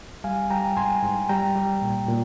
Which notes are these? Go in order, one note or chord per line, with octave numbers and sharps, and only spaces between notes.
G3 F5 G#5
G3 G5 A#5
G#2 G#5 C6
G#2
G3 G5 A#5
G3
A#2
A#2